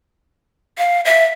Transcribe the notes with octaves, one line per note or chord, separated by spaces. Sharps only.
F5
E5